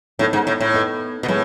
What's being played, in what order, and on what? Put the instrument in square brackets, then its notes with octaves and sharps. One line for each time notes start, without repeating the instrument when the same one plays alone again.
[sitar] A2 [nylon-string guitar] B3 D#4 A4 D#5
[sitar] G#2
A2
A2
[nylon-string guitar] B3 D#4 A4 D#5
[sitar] B2
[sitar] A2 [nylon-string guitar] G#3 B3